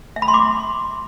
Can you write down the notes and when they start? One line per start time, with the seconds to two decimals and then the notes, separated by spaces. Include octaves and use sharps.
0.16 E5
0.22 B5
0.28 C6
0.34 D6